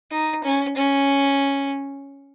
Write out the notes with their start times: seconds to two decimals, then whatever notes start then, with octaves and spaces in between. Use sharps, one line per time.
0.11 D#4
0.44 C#4
0.77 C#4